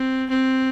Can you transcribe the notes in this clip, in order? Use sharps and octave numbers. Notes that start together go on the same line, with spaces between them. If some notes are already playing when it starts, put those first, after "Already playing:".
Already playing: C4
C4